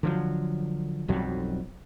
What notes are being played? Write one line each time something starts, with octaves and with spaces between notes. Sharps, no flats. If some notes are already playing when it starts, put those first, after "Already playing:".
D3 F3 F#3
B1 F2 F#3 G3